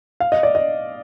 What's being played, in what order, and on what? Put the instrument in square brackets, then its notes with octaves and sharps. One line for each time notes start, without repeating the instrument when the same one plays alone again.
[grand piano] F5
D#5
D5
D#5